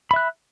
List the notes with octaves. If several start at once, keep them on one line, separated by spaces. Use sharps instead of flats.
E5 B5 F#6